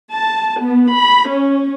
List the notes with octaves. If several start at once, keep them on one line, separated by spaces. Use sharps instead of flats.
A5
B3
B5
C#4